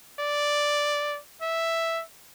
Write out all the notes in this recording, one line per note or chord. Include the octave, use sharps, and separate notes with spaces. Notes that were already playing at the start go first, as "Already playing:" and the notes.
D5
E5